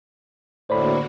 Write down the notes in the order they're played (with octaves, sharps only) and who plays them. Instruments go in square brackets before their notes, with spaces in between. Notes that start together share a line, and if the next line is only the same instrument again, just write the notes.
[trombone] A2 [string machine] D3 A#3 F#4 [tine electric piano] C5 D5 B5